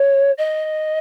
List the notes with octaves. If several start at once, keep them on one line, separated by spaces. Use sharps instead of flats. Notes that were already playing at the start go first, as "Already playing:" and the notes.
Already playing: C#5
D#5